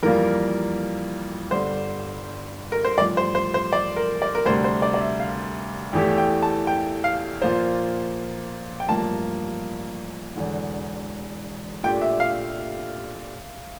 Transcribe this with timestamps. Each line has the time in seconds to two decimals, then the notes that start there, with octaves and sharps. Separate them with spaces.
0.03 F2 E3 G3 A#3 F4 A#4
1.51 G1 G2 D3 G3 C5
2.72 A#4
2.85 C5
2.98 A1 G2 F3 D5
3.17 C5
3.35 C5
3.54 C5
3.73 D5
3.96 A#4
4.22 D5
4.35 A#4
4.45 D2 C3 G3 D4 C5
4.64 C5
4.82 D5
4.94 D5
5.01 E5
5.20 F5
5.93 E2 E3 A3 E4 G4 G5
6.18 G5
6.42 A5
6.67 G5
7.04 F5
7.42 A#2 F3 A#3 F4 C5
8.80 G5
8.89 A1 G2 F3 A#3 A5
10.35 E1 E2 D3
11.83 A#2 A3 D4 G4 G5
12.01 E5
12.20 F5